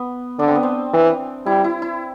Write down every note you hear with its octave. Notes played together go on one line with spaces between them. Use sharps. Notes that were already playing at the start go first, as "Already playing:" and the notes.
Already playing: B3
D3 D4
C4
B3
C4
E3
G3 E4
E4
E4